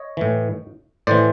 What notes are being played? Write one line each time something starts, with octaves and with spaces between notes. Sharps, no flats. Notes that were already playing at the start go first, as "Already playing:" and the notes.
Already playing: C#5 D#5
A2 E3
A2 E3 C5 D5